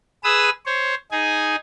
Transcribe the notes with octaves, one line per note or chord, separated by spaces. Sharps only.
G#4 B4 D#6 E6
C5 C#5
D#4 G#4 G#5